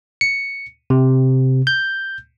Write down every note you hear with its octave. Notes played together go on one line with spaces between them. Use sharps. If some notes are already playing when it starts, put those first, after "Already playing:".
C#7
C3
G6